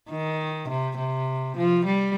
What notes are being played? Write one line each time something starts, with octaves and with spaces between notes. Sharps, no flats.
D#3
C3
C3
F3
G3